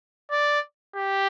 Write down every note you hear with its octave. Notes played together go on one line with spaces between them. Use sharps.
D5
G4